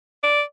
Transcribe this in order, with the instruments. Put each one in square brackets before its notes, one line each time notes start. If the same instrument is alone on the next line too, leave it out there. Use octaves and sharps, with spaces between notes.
[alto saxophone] D5